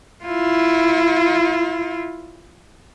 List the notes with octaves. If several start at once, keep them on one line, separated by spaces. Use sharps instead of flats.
E4 F4